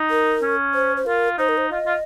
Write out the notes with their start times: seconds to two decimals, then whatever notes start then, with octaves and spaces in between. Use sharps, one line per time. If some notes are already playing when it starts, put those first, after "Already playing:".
Already playing: D#4
0.10 A#4
0.42 C#4
0.74 C5
0.97 C5
1.06 F4 A#4
1.38 D#4 C5
1.49 A#4
1.57 C5
1.70 F4 D#5
1.86 F4